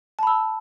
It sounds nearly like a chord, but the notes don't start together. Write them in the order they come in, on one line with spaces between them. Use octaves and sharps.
A5 B5 E6